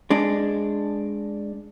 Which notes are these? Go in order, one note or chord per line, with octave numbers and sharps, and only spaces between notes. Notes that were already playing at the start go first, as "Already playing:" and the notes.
G#3 D4